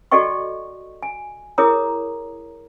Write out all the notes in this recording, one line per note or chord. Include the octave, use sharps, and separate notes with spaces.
F#4 A4 D5 D#5 G5 C#6
G#5
E4 G#4 A#4 C#5 A#5 D#6